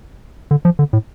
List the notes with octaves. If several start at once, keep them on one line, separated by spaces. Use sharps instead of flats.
D3
F3
D3
A2